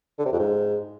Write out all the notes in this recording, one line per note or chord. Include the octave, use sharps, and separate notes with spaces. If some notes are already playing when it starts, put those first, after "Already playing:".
D3
C3
F2
G#2